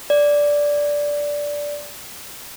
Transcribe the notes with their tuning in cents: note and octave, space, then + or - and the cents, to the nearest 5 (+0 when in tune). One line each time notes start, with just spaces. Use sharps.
D5 -10